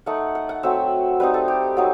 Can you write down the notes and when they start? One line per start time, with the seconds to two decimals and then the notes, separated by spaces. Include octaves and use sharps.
0.06 A3 D#4 F#5
0.35 F#5
0.49 F#5
0.63 F#3 A3 C4 E5
1.20 G3 C4 D#4 B4
1.34 A4
1.48 G4
1.77 F#3 C4 D#4